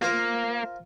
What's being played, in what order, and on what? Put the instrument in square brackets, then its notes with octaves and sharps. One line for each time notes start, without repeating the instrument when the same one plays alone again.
[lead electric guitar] A#3 [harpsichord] F4 A#4 C5